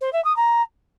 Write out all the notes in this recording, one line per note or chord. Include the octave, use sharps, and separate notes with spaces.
C5
E5
D#6
A#5